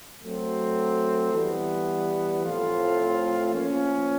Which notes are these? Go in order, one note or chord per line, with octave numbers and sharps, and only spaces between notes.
F#3 A3 C4
E3 G3 B3
A2 F3 A3 C4 F4
F3 A#3 C#4